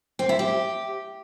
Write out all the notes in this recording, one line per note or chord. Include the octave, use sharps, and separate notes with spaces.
C4
E4
G4